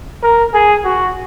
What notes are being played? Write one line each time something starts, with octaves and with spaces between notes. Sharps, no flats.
A#4
G#4
F#4